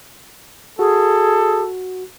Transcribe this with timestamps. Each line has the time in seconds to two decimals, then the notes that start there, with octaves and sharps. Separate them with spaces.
0.79 F#4 G#4 A4